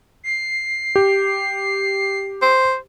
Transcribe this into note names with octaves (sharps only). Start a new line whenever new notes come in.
C7
G4
C5